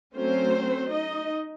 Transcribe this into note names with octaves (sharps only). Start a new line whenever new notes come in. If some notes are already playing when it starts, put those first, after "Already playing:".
F#3 A3 C4 C#4 C5
D#4 D#5